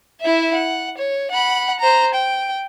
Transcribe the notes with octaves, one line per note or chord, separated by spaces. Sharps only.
E4 E5
F#5
C#5
F#5 B5
C5 A#5
G5